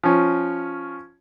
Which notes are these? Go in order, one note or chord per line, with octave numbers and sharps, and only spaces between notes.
F3 C#4